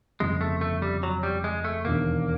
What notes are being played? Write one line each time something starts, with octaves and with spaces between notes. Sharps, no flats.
G1 F2 C#3 G#3
A3
A3
G3
F#3
G3
G#3
A3
E1 D#2 D3 A#3